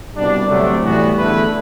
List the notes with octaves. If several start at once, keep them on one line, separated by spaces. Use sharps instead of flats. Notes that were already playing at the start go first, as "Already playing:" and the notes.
C2 B2 G3 D4
D2 C3 F#3 A3 D4
A2 E3 G3 B3 F#4
E2 D3 A3 E4 B4